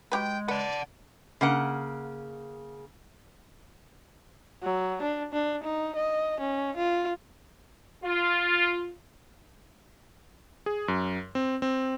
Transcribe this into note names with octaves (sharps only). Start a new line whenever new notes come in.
F#3 G#3 G4 B4 G5
B4 D5 F#5 A5
C#3 A#3 F#5
F#3
D4
D4
D#4
D#5
C#4
F4
F4
G#4
F#2
C4
C4